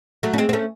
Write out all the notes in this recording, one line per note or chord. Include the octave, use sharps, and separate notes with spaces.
F#3 A3
C#4
G#3 C4
C4
A3 C#4